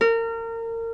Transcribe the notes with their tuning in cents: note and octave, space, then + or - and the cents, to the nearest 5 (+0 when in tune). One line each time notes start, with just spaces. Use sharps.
A#4 -30